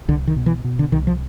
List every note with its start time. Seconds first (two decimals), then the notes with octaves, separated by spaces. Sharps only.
0.08 C2 D3
0.27 D#3
0.36 B2
0.46 E3
0.64 B2
0.79 D3
0.92 C2 D#3
1.07 F3